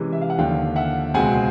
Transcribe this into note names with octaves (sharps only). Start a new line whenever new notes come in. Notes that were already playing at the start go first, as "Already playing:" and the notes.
Already playing: C3 E3 G#3 C#4
E5
F5
F#5
D#2 D3 F3 F5 G5
E5 F#5
C#2 B2 G#3 C4 F#5 G#5